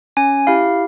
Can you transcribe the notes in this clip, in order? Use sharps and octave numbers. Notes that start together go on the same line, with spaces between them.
C#4 G#5
E4 G4 F5